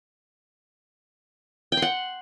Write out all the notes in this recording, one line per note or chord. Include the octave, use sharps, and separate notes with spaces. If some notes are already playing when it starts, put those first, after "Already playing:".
G5
C6
F#5